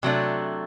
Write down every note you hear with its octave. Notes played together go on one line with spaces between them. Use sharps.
C3 F#3 A3 D4